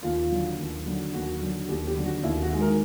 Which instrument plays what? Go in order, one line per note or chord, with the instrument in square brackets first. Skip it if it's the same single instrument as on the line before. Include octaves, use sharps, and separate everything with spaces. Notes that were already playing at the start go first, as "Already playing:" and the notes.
[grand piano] D#2 F4
D3 F#3
D#2
D3 F#3
D#2 F#4
D3 F#3
D#2 G4
G4
D3 F#3
F#4
D#2 E4
F#4
D#3 G#3
A#4